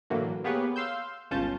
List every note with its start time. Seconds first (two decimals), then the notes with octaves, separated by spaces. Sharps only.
0.10 A2 D3 E3 F#3 A#3
0.44 A#3 B3 G4 G#4 B4 C#5
0.76 F5 C6 E6 G6
1.31 G1 C#2 C#4 F4 A5 G6